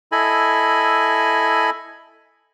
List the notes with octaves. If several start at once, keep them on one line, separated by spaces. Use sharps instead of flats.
E4 A4 D#5 G#5 B5